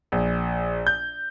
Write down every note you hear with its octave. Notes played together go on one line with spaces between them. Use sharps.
A#1
G6